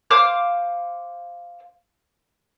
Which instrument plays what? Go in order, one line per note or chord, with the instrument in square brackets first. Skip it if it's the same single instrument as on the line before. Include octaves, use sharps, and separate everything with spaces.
[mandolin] C5 F5 D6 F6